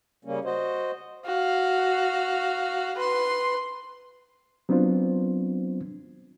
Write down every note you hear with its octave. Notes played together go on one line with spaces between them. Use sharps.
C#3 G3 A#3 C#4
F#4 C5 D#5
F#4 F5
B4 C6
F#3 B3 C4 D4 F4 C5